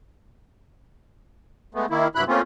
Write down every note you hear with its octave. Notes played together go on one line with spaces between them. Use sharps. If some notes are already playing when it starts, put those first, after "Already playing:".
G#3 A3 B3
D#3 A#3 E4
G2 C3 F#3 E4 B5 F#6
A3 A#3 C4 C#4 F4